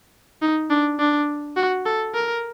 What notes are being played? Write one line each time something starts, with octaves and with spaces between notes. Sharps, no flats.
D#4
D4
D4
F#4
A4
A#4